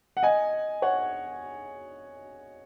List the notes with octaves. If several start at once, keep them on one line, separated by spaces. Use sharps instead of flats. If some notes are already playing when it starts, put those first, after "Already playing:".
F#5
D#5 G#5
C#5 F#5